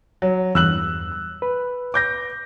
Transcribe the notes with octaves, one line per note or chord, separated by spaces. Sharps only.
F#3
E2 G2 E6 F#6 F#7
B4
D6 G6 A#6